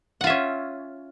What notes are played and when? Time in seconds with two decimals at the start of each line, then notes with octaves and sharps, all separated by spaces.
0.21 F#5
0.24 F4
0.27 E5
0.30 C#4